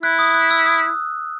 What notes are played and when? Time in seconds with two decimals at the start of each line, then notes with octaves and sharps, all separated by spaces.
0.03 E4 F#6
0.19 D#6
0.34 F#6
0.51 E6
0.66 D#6